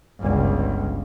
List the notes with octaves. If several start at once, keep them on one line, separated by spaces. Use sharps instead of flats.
G1 C#2